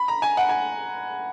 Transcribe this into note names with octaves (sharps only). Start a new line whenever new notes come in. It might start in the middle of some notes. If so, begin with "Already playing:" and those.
Already playing: B5
A#5
G#5
F#5
G#5